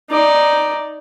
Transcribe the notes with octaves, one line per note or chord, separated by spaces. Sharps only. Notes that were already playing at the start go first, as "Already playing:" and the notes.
D#4 D5